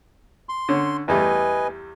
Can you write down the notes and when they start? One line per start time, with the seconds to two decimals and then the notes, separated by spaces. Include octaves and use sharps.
0.49 C6
0.69 D3 C#4
1.08 E2 G3 A3 B4 D#5 G#5